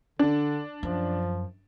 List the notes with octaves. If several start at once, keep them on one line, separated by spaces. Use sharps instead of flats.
D3 D4
F#2 F3